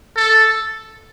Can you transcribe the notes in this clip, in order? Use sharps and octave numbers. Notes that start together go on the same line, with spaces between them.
A4